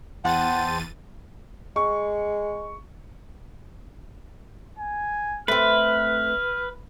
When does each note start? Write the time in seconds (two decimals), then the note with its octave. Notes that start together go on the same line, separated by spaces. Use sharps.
0.25 E2 C5 F#5 G5 A5 A6 D#7
1.76 G#3 C#6
4.79 G#5
5.48 A3 C4 B4 F6